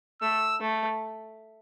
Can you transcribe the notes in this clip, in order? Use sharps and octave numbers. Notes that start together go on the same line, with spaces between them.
A3 E6
A3